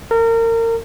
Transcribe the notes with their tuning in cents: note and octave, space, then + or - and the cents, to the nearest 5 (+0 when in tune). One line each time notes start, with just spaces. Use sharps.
A#4 -30